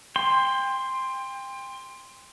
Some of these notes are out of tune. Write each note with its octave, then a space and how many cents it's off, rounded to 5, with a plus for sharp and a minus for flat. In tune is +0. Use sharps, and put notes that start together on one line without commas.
G5 +30 C6 +0